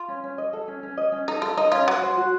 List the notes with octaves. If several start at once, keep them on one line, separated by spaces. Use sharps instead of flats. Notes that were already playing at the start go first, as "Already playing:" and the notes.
Already playing: F4
C#4
C#4
D#5
A4
C#4
C#4
D#5
C#4
D#4 A4
F4 A4
D#4 D#5
C#4 F4
F#3 F#5
C5
F#4